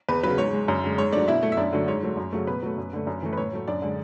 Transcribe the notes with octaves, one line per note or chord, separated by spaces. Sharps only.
E2 B4
C#3 F#3 B4
G#2 C#5
G#3
F#2
D3 G#3
G#2 C#5
F#3 A3 D4 D5
B2 E4 E5
A3
E5
F#2 D4 D5
D3 F#3 A3
G#2 C#5
F#3 A3
F#2
C#3 F#3 A3
B2 B4
F#3 A3
F#2
D3 A3
F#2
E3 A3
B4
A2 C#5
F#3 A3
F#2 D4 D5
D3 G#3